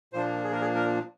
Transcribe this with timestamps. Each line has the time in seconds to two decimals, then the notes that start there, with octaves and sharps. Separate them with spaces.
0.13 A#2 F3 A#3 D4 C5
0.44 G#4
0.52 A#4
0.61 G#4
0.75 A#4